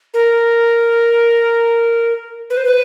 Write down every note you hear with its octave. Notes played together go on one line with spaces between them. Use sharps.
A#4
B4
C5
B4